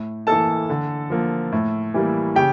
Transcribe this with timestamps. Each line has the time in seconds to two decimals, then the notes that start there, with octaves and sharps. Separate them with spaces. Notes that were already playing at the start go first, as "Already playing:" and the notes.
Already playing: A2
0.27 E3 A#3 A4 A5
0.69 D3
1.10 F3 A#3
1.52 A2
1.94 E3 G3 A#3
2.36 C#3 G4 G5